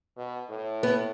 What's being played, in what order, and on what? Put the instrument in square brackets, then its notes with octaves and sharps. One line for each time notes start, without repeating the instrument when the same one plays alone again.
[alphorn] B2
A2
[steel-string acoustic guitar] B3